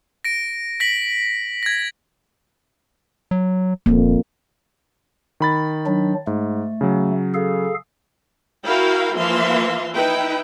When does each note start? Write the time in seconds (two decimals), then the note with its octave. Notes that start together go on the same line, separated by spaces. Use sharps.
0.24 A#6 D7
0.80 A#6 B6 F#7
1.63 G#6 A#6
3.31 F#3
3.86 D#1 F2 A#3
5.40 D#3 B5 A6
5.86 F#3 D4
6.27 G#2 A3
6.81 C#3 F#3
7.34 G#4 A4 F5
8.66 E4 F#4 A#4 F5 G5 B5
9.17 E3 F3 A#3 E5 F5 C6
9.94 D#4 E4 B4 G5